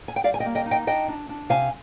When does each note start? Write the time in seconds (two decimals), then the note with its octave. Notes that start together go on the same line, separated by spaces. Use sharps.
0.08 G#5
0.16 G5
0.24 G3 D5 F5
0.34 G#5
0.40 D#5 G5
0.45 A#3
0.55 D#5 G5
0.66 D#4
0.71 D#5 G5
0.87 D4 D#5 G5
1.08 D4
1.29 D4
1.50 C3 F5 G#5